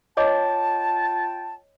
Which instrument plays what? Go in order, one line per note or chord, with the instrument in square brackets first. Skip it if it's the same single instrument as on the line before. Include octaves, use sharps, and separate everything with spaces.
[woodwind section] F4 G5 A5 [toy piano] C#5 D#5 D6